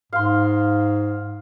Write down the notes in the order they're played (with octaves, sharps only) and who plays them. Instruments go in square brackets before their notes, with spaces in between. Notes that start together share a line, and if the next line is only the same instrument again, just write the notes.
[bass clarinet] G#2 [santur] F5 C6